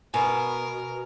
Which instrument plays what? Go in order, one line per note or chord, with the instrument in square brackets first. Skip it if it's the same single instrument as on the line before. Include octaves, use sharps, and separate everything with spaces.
[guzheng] B2 [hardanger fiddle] A#4 [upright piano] G#5